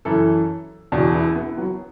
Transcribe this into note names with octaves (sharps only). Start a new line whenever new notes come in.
F#2 E3 E4 A4
E2 B2 D4 F#4
B3 E4
B3 E4
F#3 B3